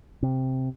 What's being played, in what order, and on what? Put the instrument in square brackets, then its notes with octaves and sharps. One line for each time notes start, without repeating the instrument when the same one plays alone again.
[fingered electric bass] C3